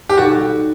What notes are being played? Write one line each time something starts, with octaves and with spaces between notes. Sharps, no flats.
G4
B2 G3 D#4 F#4 A4